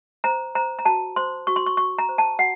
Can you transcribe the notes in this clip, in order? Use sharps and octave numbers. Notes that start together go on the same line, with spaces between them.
C5 A#5
C5 A#5
A#5
F#4 A5
C5 C6
F#4 C#6
C6
C#6
F#4 C#6
A#5
C5
A5
F#4 F#5